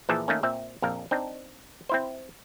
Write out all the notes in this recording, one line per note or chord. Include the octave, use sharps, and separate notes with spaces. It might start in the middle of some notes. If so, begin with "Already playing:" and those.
A#2 E3 F3 G#4 E5 A5
D#3 A3 A#3 C#4
A#2 C4 E5
A#1 F2 A#4 F5
C4 D4 D#4
C4 E4 C5